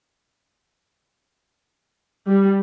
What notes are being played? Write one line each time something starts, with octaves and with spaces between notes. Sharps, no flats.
G3